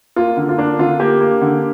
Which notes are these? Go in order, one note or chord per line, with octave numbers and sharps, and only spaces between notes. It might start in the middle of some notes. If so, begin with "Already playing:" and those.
A#3 F4
D3
F4
A#3 D4
D3 F4
A#3 G4
A#3
D3